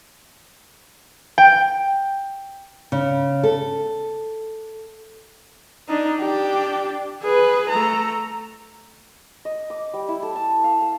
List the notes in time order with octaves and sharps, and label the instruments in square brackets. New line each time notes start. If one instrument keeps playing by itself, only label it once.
[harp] G5
[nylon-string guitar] C#3
A4
[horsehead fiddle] D4 D#4
D4 G4
G#4 B4
A3 A#5
[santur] D#5
D6
G3
E4
A4
A5
F5
A5